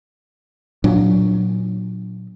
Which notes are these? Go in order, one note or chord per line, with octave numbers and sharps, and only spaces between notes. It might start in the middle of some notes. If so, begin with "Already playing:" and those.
A#2 F#3 D4